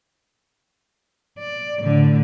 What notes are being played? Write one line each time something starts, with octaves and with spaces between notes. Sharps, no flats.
D5
A2 D3